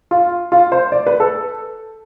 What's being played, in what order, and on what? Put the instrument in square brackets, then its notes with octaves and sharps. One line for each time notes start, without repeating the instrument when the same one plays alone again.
[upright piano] F4
F4
C5
D5
B4
A4